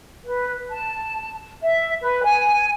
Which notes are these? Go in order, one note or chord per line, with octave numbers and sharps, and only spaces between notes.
B4
A5
E5
B4
G#5